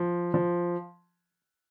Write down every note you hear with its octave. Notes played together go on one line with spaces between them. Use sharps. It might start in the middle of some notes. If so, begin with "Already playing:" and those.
Already playing: F3
F3